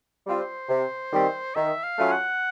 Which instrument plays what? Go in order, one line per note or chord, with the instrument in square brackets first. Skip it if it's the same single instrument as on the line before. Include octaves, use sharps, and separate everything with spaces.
[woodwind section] G3 C4 F4
[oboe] C5
[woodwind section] C3
D#3 G3 C4
[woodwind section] D#3 [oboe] E5
[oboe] F5
[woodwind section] F#3 A3 C#4 F4
[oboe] F#5